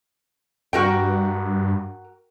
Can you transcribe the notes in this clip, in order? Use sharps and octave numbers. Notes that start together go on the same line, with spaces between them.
G2 F#4 A#4 G5